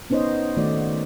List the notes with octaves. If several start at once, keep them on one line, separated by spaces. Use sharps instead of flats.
B3 C#4 D#4 C5 C#5 D#5
D#3 A3 F#4 D5